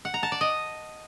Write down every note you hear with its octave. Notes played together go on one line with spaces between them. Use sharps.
F#5
A#5
A5
D5
D#5